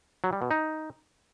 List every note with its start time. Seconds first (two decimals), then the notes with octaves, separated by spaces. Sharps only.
0.24 F#3
0.33 G3
0.42 B2
0.51 D#4